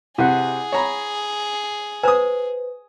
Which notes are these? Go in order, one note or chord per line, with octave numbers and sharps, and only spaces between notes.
C3 E4 G#4 F#5
C#5 A#5 B5
B4 C5 G#5 D#6